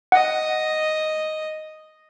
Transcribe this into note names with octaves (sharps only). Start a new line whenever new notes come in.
D#5 F#5